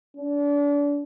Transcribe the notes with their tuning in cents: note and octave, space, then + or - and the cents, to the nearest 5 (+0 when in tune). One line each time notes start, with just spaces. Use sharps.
D4 -30